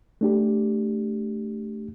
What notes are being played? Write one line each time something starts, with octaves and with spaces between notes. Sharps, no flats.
A3 D4 G4